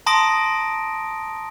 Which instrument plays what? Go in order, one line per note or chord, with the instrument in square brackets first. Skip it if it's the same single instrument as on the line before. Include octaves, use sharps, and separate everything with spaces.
[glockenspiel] A5 A#5 C6 D#6 A#6 D7